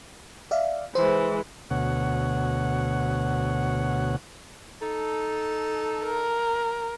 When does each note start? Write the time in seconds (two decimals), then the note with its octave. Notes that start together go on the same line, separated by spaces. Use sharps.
0.51 D5 E5 F5
0.95 E3 G#3 C5
1.71 D2 B2 C#5 F#5
4.82 D#4 A4
6.05 A#4